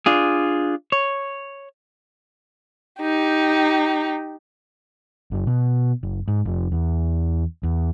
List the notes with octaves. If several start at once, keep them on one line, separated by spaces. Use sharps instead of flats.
D4 F4 G#4
C#5
D#4 G4
F#1
B2
F#1
G#2
F1
E2
E2